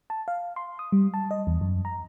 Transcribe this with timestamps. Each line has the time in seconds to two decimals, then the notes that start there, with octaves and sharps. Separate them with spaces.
0.10 A5
0.28 F5
0.56 C6
0.79 D#6
0.92 G3
1.14 A5
1.31 D#5
1.47 E2
1.61 F#2
1.85 A#5